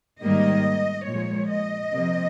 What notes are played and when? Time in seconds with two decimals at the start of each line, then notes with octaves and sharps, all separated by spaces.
0.23 G#2 D#3 G3 A#3 D#5
1.07 A#2 F3 G#3 C#5
1.50 D#5
1.92 C3 F3 A#3